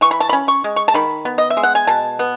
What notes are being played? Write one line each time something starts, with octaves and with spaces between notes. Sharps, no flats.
E3 C#6
B5
A5
B5
C#4
C#6
G#3
C#6
A5
D#3 B5
B3
D#5
E5
G#3
F#5
G#5
B2 A5
B3